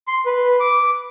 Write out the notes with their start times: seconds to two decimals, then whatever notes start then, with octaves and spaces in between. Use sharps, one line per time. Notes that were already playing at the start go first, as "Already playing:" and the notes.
0.08 C6
0.26 B4
0.60 D6